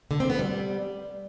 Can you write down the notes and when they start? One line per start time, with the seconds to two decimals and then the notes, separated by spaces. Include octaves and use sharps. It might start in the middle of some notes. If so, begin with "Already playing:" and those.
0.11 D3
0.20 C4
0.30 B3
0.39 G3